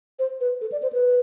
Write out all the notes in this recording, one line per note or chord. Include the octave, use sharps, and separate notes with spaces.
C5
B4
A4
D5
C5
B4